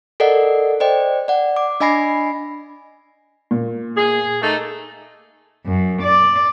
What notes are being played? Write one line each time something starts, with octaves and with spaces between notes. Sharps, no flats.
A4 A#4 D5 D#5 F#5
C5 D5 D#5 G5
D5 F#5
D6
D4 D#5 G#5 B5 A#6 C7
A#2
G#4
A3 A#3 D#4
F#2
D5